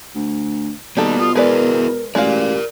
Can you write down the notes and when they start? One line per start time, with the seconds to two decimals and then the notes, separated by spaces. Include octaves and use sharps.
0.15 D2
0.97 B2 G3 A#3 D#4 A4
1.19 F4 D#6
1.35 G#3 E4 G#4 A#4 B4 D5
2.15 A1 G#3 F#4 G4 A#4 D5 F5